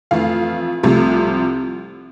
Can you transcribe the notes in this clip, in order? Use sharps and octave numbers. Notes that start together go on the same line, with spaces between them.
F2 E3 A3 F5
C2 C3 F3 A3